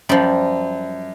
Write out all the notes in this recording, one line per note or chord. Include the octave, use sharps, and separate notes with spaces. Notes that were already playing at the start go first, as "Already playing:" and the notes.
F#2 F3 G3